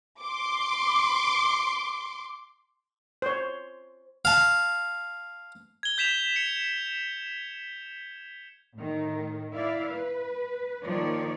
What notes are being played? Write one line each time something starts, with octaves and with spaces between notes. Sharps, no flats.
C6 D6
C5 C#5
F5 A5
G#6 G7
G6 B6 E7 F7
C#7
A2 D#3
E4 D5 F5
B4
D#3 F3 A#3 C#5 D5